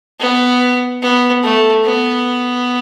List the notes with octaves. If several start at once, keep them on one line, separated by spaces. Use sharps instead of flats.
B3
B3
A3
B3